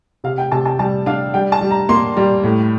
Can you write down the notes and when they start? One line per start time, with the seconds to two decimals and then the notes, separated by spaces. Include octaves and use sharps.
0.24 C3 F5
0.38 G5
0.52 C3 A5
0.65 A5
0.79 G3 A5
1.06 D4 F5
1.34 G3 G5
1.52 A5
1.61 G3
1.71 A#5
1.89 A#3 C6
2.17 G3
2.44 A2